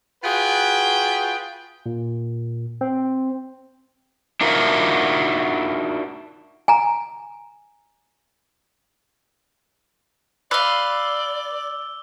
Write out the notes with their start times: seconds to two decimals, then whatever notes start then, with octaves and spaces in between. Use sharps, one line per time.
0.23 F4 F#4 G#4 B4 G5
1.86 A#2
2.81 C4
4.41 D4 D#4 F4 F#4 A#4 E5
6.68 G#5 A#5
10.51 B4 D5 F5 D6 E6 G7